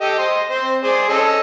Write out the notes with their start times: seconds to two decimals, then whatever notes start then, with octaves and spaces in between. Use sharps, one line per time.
0.01 G4 A4 D#5
0.19 C5 D#5 C6
0.51 C4 C5
0.83 G#4 C5 D5
1.09 C#4 A4 D#5